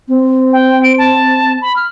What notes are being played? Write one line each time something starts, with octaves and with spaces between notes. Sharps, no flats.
C4
G5
D7
A5
B5
F6